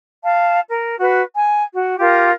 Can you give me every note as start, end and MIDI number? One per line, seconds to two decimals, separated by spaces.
0.23 0.59 77
0.23 0.59 81
0.68 0.95 70
0.99 1.22 66
0.99 1.22 71
1.34 1.62 80
1.72 1.96 66
1.99 2.31 65
1.99 2.31 67
1.99 2.31 70